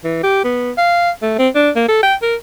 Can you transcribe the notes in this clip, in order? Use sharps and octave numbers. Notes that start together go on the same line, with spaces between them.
E3
G4
B3
F5
A3
C4
D4
A#3
A4
G5
A#4